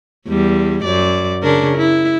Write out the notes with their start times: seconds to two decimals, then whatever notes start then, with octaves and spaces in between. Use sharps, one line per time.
0.28 E2 G3
0.84 F#2 D5
1.43 C#3 D4 A#4
1.77 E4